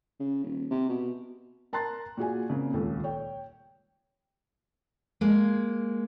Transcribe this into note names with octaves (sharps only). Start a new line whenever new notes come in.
C#3
D#1
C3
B2
A#4 A5 A#5 C6 F#6 A6
A#2 F#4 G#4 G#5
C#3 A#3 C4
D#1 C#2 A4
C#5 G5
G#3 A#3